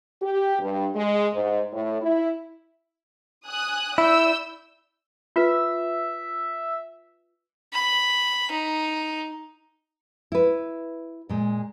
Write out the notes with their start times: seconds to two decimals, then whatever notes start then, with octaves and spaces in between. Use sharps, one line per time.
0.23 G4
0.59 G2
0.95 G#3
1.33 G#2
1.72 A2
2.01 E4
3.47 G#5 D#6 F#6
3.98 E4 D5 E6 G6
5.36 F4 B4 E5
7.73 B5
8.51 D#4
10.32 E4 B4
11.29 A#2 G#3